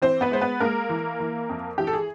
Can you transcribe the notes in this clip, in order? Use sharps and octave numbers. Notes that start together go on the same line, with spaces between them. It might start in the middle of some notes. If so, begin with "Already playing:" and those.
E3 C4 C5
B3 B4
G#3 C5
B3 B4
G#3 A#3 A#4
E3
E3
F2
E3 G4
A4
G#4